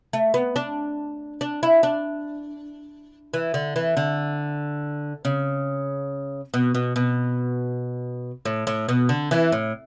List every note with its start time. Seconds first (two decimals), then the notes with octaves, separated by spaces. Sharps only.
0.13 A3
0.34 B3
0.56 D4
1.41 D4
1.63 E4
1.83 D4
3.34 E3
3.54 D3
3.76 E3
3.97 D3
5.25 C#3
6.54 B2
6.75 B2
6.96 B2
8.45 A2
8.67 A2
8.89 B2
9.09 D3
9.31 E3
9.52 A2